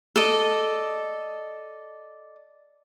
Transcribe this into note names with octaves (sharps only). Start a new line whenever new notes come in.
A4 D5 D#5